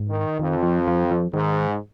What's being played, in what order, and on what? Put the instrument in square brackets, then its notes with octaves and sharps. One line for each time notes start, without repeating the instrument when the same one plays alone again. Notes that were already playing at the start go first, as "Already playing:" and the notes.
Already playing: [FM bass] G#2
[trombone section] D#3
[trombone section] F2 [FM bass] D#3
[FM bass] F3
F3
F3
[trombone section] G#2 [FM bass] D#3